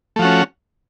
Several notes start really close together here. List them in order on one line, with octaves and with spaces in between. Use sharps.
A3 F3 F#4 C#4